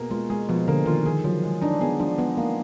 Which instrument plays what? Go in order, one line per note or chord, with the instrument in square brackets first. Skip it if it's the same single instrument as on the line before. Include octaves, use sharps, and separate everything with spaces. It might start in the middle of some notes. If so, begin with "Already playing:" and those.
Already playing: [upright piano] B2 A#3 G#4
[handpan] G#3 [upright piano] F4
[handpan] G#3 [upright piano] G#4
[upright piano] B2 [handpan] F3
[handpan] D3 [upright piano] A#3
[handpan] D#3 [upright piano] F4
[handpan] D#3 [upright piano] G#4
[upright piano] F3 [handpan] F#3
[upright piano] G#3
[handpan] D4 [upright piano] D#4
[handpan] B3 [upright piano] G#4
[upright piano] F3 [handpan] D4
[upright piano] G#3 [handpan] B3
[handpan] A#3 [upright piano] D#4